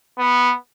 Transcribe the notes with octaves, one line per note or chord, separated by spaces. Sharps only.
B3